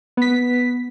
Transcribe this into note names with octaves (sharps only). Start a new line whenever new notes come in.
B3 B6